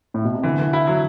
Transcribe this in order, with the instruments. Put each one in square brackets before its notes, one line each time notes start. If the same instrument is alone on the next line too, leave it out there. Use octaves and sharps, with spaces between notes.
[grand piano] A2
B2
C3
[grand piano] D3 [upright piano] E3
[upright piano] E3
E4
F#3